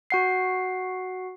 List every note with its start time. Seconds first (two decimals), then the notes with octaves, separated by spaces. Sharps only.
0.10 F#4 F#5 C7